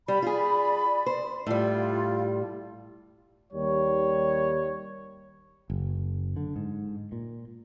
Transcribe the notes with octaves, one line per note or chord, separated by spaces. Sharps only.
G3 D5 B5
F4 G#4
C5
A2 G3 F4
D#2 G3 C#5
F#1
D3
G#2
A#2